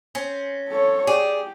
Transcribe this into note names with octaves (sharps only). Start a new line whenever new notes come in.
C4 C#4
A4 C#5
G4 G#4 D5